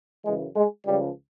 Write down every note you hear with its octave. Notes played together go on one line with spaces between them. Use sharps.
F#2 C#3 E3 G#3
G#3
C#2 C#3 F3 G3